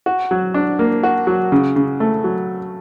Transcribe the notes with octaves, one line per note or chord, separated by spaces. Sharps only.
F#4
F#3
D4
A#3
F#4
F#3
C#3
C#3
A3
F#3